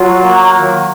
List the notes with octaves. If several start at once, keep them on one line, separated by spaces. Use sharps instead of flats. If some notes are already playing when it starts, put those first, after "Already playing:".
Already playing: F#3 F4
A#3
D#3